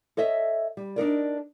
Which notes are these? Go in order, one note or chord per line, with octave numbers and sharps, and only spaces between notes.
A4 C#5 D#5 E5
G3
D4 D#4 A#4 D5